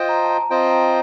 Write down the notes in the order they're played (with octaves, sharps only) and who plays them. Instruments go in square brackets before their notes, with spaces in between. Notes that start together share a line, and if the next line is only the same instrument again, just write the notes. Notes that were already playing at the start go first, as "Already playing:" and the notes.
Already playing: [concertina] F4 C5 D#5 G5
[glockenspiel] A#5
A5
A#5
[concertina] C4 F4 C5 D#5 G5 [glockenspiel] A5
[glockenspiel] A#5